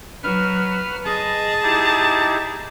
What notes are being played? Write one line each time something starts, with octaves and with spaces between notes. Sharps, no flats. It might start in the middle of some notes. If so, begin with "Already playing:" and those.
F#3 B4 F6
G#4 D#5 A5
D#4 E4 G4